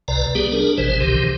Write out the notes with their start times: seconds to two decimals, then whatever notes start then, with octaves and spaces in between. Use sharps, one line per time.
0.08 C2 C3 B4 D5 A#5
0.35 G3 B3 G4 G#4
0.52 D4 G#4 A#4
0.78 G#1 B2 E3 C5
1.01 C2 C3 D#3 G4